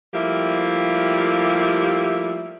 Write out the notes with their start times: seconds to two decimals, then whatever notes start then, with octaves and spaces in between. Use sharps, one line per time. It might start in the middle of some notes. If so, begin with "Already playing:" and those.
0.14 F3 G3 A3 A#3 E4 G4